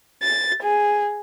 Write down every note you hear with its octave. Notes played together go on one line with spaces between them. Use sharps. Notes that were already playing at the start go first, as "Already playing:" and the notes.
A6
G#4